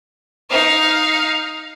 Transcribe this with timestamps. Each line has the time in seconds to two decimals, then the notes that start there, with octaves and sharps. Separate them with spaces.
0.50 D#4 F5